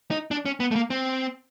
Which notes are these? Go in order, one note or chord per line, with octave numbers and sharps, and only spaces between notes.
D#4
D4
C#4
B3
A3
A#3
C4